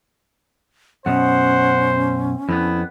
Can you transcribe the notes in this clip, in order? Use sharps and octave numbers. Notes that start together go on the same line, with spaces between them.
F#2 B2 C#4 C5 F#5
F2 B3 E4